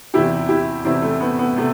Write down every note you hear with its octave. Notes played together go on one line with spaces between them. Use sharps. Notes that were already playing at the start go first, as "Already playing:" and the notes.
E2 C3 E3 E4 G4
E4 G4
E2 C3 E3 C4 E4
A3
B3
B3
C3 A3